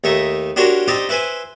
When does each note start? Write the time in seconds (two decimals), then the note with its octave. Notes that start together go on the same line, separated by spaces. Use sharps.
0.04 D#2 A3 D#4 E5
0.56 D4 F#4 G4 A#4 C5 C#5
0.88 C4 D#4 G4 C5 D5
1.09 E4 B4 C5 G#5